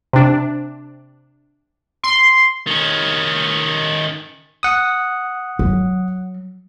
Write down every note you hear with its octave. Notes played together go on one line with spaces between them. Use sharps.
C3 D4
C6
D#3 C#4
F#5 D#6
F#3